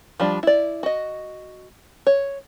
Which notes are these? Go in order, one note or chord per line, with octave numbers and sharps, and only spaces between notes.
F3 G3 D4
E4 D5
F#4 D#5
C#5